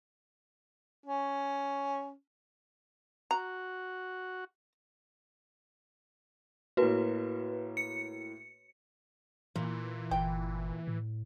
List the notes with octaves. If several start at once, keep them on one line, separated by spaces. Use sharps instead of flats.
C#4
F#4 A#5
A2 A#3 F#4 B4
C#7
A#2 E3
G1 G5
A2